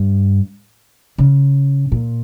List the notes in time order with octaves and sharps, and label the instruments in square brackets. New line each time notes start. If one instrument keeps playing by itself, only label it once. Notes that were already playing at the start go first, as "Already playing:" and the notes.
Already playing: [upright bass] G2
C#3
A#2